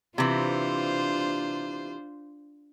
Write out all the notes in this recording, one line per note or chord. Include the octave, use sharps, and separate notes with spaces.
C3 E3 D4 F4 C5